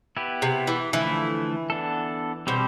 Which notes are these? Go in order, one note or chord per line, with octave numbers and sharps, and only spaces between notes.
B3 E4 G4 B4
C3
E3
D3 E3 F3 A3 E4
B3 D4 A4
B2 G3 C4 G4 C5